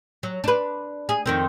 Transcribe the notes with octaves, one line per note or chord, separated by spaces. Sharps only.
F#3
D4 B4
G#4
F2 D#3 C4